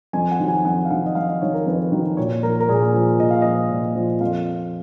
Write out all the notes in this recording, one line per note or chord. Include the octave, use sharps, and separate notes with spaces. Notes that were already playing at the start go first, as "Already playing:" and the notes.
F2 G#5
F#5
D#3 F#3
G#5
F2 F#5
F5
D#3 F#3 F#5
D#5
F2 F5
D#5
D#3 F#3 C#5
A#4
F2 B4
D#3 F#3
A#2 C#5
F3 A#4
A#4
A#2 G#4
F3
A#2 D#5
F5
F3 D#5
A#2
F3
F2 F5